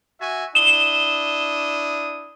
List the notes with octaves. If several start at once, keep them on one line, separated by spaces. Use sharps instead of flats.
F#4 E5 G#5
D4 E4 D#6 E7 G7